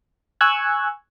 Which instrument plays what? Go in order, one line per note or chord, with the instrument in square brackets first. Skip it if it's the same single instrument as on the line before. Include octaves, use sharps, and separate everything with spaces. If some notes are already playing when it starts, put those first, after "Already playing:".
[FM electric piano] G#5 C#6 E6 F#6 G#6